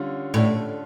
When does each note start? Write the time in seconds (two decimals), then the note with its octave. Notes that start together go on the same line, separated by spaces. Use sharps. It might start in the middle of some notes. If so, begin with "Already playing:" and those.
Already playing: D3 G3 C#4 F4
0.34 A2